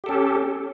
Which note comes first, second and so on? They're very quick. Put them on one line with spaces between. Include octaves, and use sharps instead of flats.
G4 A4 C#4